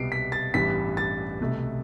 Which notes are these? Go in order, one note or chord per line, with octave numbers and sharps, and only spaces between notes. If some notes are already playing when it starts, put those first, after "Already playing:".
Already playing: C2 B2 G3 B3 C7 D7
B6
A6
A1 G2 E3 G3 B3 B6
A6
C2 B2 A3